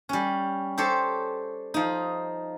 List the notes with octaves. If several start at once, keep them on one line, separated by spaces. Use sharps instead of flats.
G3 C#4
G4 A4 C5 C#5
F3 D#4